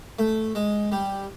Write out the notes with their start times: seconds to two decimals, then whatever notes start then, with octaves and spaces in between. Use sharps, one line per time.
0.19 A3
0.55 G#3
0.92 G3